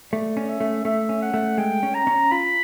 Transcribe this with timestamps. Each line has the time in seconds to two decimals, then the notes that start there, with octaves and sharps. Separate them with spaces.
0.12 A3 D5
0.37 C#4
0.49 E5
0.60 A3
0.85 A3 E5
1.09 C#4
1.22 F#5
1.34 A3
1.58 G#3 G5
1.83 C#4
1.95 A#5
2.07 C#4
2.32 F4 B5